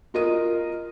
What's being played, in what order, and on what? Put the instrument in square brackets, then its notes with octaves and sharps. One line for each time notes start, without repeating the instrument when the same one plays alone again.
[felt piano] F4 A#4 D#5 D#6 D#7